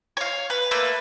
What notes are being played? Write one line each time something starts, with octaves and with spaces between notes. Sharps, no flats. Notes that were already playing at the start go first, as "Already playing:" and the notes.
C#5 F5
B4
A3 A#3 B4